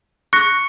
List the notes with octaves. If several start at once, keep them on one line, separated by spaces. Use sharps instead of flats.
C#6 F#6 A#6 C#7